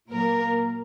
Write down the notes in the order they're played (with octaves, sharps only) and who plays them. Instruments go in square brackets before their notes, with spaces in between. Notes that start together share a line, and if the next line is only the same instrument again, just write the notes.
[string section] A#2 F#3 A#3 A#4